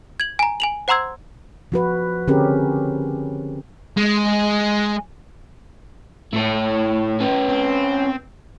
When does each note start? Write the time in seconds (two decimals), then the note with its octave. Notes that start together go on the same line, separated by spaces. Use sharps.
0.20 G#6 F#7
0.39 G#5 A#5
0.60 G#5 F7 F#7
0.88 C5 F#5 A#5 C6 E6 G#6
1.72 F3 F#4 B4
2.27 D3 C4 C#4 G4 G#4 A#4
3.97 G#3
6.33 A2 E4 C#5
7.20 C#4 B4
7.49 C4